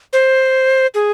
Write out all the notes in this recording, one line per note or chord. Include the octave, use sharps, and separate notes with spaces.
C5
G#4